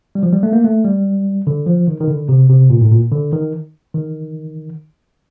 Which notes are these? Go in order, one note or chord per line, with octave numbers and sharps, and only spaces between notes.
G3
F3
G3
A3
A#3
A3
G3
D3
F3
D#3
D#3
D3
C3
C3
A#2
A2
A#2
D3
D#3
D#3